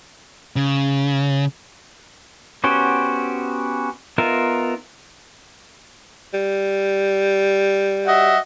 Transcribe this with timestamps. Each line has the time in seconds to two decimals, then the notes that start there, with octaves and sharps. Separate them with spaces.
0.56 C#3
2.64 B3 C#4 F#4 G4 C5
4.18 B3 D#4 F4 A#4 E5
6.33 G3
8.06 F#4 D#5 E5